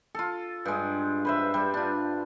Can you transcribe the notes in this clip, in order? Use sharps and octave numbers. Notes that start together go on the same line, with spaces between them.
F4 A4
G2 G#3
B4 C5 E5
G3
D4 F4